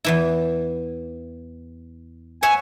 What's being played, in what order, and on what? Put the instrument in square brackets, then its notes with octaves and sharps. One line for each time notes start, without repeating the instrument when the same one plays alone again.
[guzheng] E2 E3 E4
[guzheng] C#5 E5 F#5 [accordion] G#5